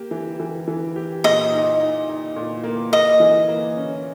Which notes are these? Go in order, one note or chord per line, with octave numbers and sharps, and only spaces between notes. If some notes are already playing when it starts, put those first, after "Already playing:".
Already playing: A#3 G4
E3
E3
E3
G4
A#2 D#5
D#4
D#4
D#4
A#2
A#3
A#3 D#5
E3
A#3
C#4